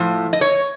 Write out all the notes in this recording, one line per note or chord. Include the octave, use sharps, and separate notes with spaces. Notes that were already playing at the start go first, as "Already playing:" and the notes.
Already playing: A2 F3
D#5
C#5